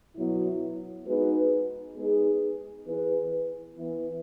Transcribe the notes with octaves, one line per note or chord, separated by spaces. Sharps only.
B2 F#3 B3 E4
G#3 B3 D#4 F#4 B4
G#3 B3 D#4 G#4
E3 B3 E4 G#4 B4
E3 B3 E4